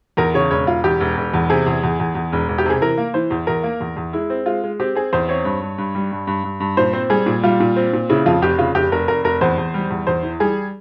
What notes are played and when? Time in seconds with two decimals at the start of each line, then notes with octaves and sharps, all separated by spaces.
0.17 E2 A#4
0.34 C#3 C#5
0.51 E1 C#5
0.67 E1 F4
0.84 E2 G4
1.00 E1
1.17 E1
1.33 E2
1.50 C3 G#4
1.66 E2
1.83 E2
2.00 E2
2.15 E2
2.33 E1
2.49 E1
2.58 G4
2.66 C3 G#4
2.81 E3 A#4
2.98 A#3
3.14 E3 C5
3.30 E2
3.47 E2 A#4
3.63 A#3
3.80 E2
3.96 E2
4.13 G#3 E4
4.30 C4
4.46 G#3 F4
4.64 G#3
4.80 C4 G4
4.95 C4 G#4
5.13 E2 C5
5.28 C4 C#5
5.45 G2
5.61 G2
5.78 G2
5.95 G3
6.12 G2
6.27 G2
6.44 G2
6.60 G2
6.77 A#2 C5
6.93 C4
7.10 G3 G#4
7.26 A#2
7.43 G3 F4
7.60 A#2
7.76 C4
7.93 A#2
8.09 C#3 E4
8.26 F2 F4
8.42 F1 G4
8.58 C#3 F4
8.75 F1 G4
8.92 F1 A#4
9.08 F1 A#4
9.24 F1 A#4
9.41 E2 C5
9.58 E2
9.74 G3
9.90 E2
10.07 E2 C5
10.23 E3
10.40 G3 G#4